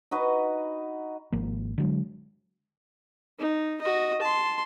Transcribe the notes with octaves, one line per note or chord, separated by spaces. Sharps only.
D#4 F#4 B4 D#5
G#1 F3 A#3
D3 F#3 G#3
D#4
F#4 D#5
A5 C6